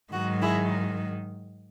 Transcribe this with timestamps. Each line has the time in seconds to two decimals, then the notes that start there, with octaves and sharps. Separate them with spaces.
0.13 G#2 D#3 F#3 F#4
0.41 E4 G#4